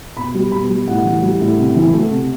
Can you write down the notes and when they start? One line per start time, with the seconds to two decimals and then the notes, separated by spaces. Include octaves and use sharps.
0.17 B2 B5
0.34 G3
0.52 B2 B5
0.70 G3
0.87 A2 F#5
1.05 E3
1.22 G3
1.41 A2
1.58 C3
1.76 E3
1.93 A3
2.10 C3